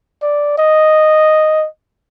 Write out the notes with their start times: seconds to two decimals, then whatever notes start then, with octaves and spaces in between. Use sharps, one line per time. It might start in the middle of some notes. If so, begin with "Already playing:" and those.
0.22 D5
0.58 D#5